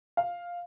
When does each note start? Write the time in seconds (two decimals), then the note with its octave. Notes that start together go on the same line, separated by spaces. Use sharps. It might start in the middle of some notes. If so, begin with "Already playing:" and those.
0.17 F5